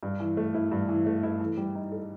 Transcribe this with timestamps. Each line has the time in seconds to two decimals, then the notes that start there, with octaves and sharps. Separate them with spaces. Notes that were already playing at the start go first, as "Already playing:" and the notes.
0.03 G2
0.20 E3
0.37 A3
0.54 E4
0.71 G2
0.89 E3
1.06 A3
1.23 E4
1.40 E3
1.57 G3
1.75 D#4
1.92 A4